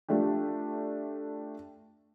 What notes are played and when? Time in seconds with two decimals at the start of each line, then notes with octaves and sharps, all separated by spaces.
0.09 A3 D4 F4 G4